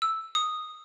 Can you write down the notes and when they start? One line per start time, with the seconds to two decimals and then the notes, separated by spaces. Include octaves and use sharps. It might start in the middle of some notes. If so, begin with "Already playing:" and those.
0.02 E6
0.35 D#6